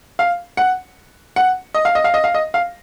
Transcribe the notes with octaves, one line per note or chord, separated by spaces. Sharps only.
F5
F#5
F#5
D#5
F5
D#5
F5
D#5
F5
D#5
F5